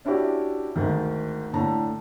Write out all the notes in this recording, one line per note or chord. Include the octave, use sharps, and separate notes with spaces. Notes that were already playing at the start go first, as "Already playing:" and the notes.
C#4 D4 E4 F#4 G4
D2 G#2 D#3
A2 D3 A5 A#5